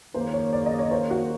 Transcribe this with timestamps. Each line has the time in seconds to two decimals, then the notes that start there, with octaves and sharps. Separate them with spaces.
0.14 D#2 C#3 F3 A#3 C5
0.33 C#5
0.53 D5
0.66 D#5
0.79 C#5
0.91 C5
1.11 F#4